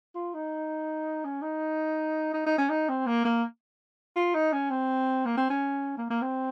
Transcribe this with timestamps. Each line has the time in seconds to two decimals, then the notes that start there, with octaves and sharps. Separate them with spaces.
0.15 F4
0.34 D#4
1.25 C#4
1.42 D#4
2.34 D#4
2.46 D#4
2.58 C#4
2.70 D#4
2.89 C4
3.07 A#3
3.25 A#3
4.16 F4
4.35 D#4
4.53 C#4
4.71 C4
5.26 A#3
5.37 C4
5.50 C#4
5.98 A#3
6.10 A#3
6.22 C4